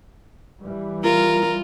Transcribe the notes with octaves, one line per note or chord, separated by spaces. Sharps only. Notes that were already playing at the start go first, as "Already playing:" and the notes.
E3 G3
F4 A#4